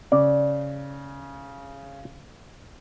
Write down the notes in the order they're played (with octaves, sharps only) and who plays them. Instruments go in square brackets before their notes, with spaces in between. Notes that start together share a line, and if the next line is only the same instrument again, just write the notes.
[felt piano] C#3 [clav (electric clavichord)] D5